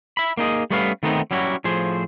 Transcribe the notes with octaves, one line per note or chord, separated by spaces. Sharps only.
E5 B5
A#3 D#4 G#4 D#5
G3 A3 B3 C#4 B4 F5
D#3 A3 B3 C4 D#4
F#3 G3 C#4 E4 F#4
A2 F3 G#4 C5